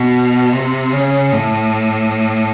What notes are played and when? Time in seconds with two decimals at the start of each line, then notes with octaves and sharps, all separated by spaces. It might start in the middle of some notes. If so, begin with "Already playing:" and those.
Already playing: B2
0.52 C3
0.93 C#3
1.32 A2